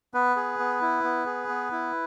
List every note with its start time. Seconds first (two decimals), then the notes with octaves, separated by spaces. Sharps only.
0.14 B3 B4
0.36 G#4
0.59 B3
0.81 E4
1.04 B3
1.26 G#4
1.48 B3
1.72 E4